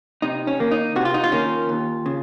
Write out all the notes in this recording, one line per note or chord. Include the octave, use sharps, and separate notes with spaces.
C3 D#4
C#4
D#3 A#3 C#4
D#4
C3 F#4
F4
D#4
F4
D#3 A#3 C#4
D#2
C#3